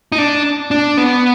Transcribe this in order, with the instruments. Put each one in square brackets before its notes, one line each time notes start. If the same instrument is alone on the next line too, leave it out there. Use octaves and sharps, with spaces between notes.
[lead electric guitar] D#4
D4
D4
B3